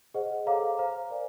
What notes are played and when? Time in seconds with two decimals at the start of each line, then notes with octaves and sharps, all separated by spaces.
0.14 G#4 C5 D#5 F#5
0.46 A4 C#5 F5 A#5 D6
0.78 C5 F5 A#5
1.10 A#4 D5 F5 G#5